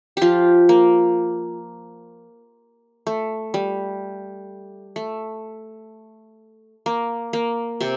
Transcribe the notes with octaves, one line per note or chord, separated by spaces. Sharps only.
F3 F4 G4
A#3
A3
G3
A3
A#3
A#3
C3 C4